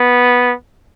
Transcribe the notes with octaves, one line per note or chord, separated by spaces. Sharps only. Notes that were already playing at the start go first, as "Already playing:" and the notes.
Already playing: B3